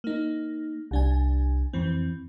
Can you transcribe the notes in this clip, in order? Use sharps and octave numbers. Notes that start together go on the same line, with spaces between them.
A#3 D#4
C2 D4 G#5
F2 E3 C4